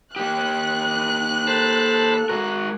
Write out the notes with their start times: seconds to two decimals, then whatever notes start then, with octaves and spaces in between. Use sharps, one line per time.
0.16 A#3 G4 F#6
1.47 A4 C5 A5 B5
2.29 G#3 F#4 A#4